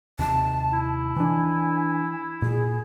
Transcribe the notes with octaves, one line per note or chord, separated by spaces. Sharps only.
D#2 C3 A5
E4
E3 D4 G#5
A#2 G#4